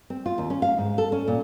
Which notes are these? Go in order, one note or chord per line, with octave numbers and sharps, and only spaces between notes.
C4
F4
D#2
C#4
F5
G#2
A4
C#4
A#2